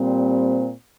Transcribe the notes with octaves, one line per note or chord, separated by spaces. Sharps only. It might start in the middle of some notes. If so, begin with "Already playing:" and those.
Already playing: A#2 G3 C4